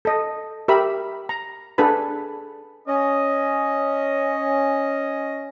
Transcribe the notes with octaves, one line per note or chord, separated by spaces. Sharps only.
A4 D#5
G4 A#4 E5 B5
A#5
D4 G#4 A4 B4 B5
C#4 D#5